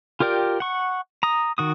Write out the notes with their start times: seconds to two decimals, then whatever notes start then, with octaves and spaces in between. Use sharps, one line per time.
0.20 F4 G4 A#4 D5 G5
0.60 F#5 C#6
1.23 A#5 D#6
1.58 D#3 F#4 D#6